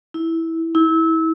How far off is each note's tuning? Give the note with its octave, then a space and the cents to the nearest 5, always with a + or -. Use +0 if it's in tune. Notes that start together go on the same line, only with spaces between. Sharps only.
E4 -10
E4 -25